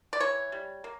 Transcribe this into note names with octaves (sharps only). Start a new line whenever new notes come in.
D5
E3 C#5
G3
A#3